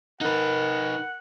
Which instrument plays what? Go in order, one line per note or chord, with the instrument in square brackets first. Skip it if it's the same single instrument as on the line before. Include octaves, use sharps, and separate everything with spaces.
[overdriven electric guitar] D#4 B4 [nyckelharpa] A#4 [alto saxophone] F#5